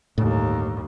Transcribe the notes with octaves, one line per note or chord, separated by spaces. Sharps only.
G1 D#2 A2